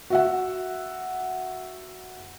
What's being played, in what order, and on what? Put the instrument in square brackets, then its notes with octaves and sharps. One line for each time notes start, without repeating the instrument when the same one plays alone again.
[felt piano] F#4 E5 F#5